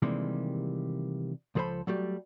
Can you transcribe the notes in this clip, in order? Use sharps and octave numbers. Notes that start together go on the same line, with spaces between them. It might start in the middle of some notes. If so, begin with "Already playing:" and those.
C3 D#3 E3 G3 G#3 A#3
C#2 F3 G#4 A4 C5 B5
F#3 G3 A3 G4